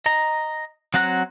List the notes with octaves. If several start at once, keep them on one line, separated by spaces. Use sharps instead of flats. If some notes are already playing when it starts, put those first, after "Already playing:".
D#5 A#5
F#3 C4 F#5 A#5 F#6